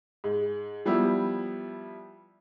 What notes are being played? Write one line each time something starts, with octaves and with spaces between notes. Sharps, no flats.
G#2
F3 G3 B3 E4